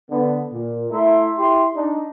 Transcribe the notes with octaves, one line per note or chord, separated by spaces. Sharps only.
D3 B3
A#2
A3 E4 E5 A#5 C6
E4 G4 C6
D4 D#4